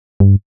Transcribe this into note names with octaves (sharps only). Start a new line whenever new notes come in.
G2